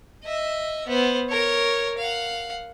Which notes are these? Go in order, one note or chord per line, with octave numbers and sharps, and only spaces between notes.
D#5 E5
B3 C5
A#4 C#5
F5 F#5